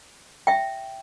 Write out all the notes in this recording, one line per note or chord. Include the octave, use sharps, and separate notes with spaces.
E5 G5